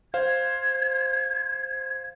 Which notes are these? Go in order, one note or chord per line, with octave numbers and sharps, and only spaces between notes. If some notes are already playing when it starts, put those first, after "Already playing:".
C5 F5 G#6